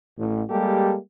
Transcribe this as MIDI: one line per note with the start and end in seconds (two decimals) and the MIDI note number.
0.17 0.42 33
0.49 0.96 55
0.49 0.96 56
0.49 0.96 58
0.49 0.96 67
0.49 0.96 69